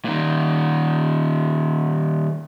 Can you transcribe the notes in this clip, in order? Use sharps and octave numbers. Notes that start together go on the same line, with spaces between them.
A#2 D#3